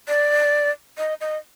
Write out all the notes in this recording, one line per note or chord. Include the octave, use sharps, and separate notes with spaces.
D5
D#5
D#5